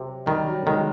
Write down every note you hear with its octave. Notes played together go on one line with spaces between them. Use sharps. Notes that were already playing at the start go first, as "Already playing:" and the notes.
Already playing: C3 F#3
D#3 G3
F#3
D#3 G#3